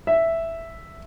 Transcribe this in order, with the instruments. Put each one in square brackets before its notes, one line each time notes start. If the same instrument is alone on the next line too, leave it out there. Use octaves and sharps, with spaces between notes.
[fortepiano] E5